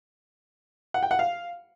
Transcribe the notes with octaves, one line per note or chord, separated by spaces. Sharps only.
F#5
G5
F#5
F5